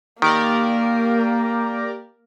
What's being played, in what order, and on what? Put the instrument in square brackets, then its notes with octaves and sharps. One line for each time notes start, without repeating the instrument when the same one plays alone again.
[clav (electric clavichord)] D#3 [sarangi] A#3 [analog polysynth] G4 A#4 D5